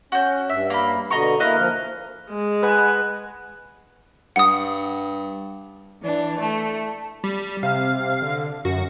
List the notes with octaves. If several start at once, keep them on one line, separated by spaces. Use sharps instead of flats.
C#4 F#4 G6
G2 E5
A#3 B5
B2 D3 D#5 A#5 C#6
A#3 E4 B4 D#5 F6
F3 A#3
G#3
B4 F#5 G#5
G2 F#5 D#6
E3 D4
A3
G3
C3 F5
D3
F#2 F#4